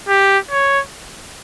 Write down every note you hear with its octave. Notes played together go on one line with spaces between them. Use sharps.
G4
C#5